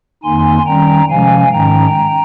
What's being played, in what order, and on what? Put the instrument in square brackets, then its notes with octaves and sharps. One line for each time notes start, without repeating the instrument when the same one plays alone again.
[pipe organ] F2 D#3 A#3 D#4 G#5 C6
D#3 G3 C#4 G5 A#5
C3 F3 G#3 C#4 F5 G#5
G#2 D#3 G#3 C#4 G5 A#5